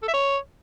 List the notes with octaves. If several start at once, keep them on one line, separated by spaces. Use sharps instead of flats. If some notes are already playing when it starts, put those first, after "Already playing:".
A4
E5
C#5